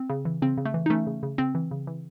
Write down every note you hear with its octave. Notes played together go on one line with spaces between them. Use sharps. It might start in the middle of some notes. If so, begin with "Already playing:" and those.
Already playing: C4
C#3
E3
C#3 C4
C#3
A3
E3
D#4
E3 A3 C#4
C#3
C#3
C#3 C4
E3
C#3
E3